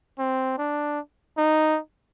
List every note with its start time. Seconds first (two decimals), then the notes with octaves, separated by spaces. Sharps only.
0.19 C4
0.58 D4
1.38 D#4